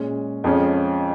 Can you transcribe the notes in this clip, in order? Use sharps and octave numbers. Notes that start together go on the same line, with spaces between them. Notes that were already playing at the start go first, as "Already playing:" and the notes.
Already playing: A#2 G#3 C#4
F2 F3 G#3 C#4